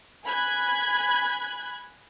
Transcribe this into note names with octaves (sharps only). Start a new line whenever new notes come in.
G#5 B5 F#6 G#6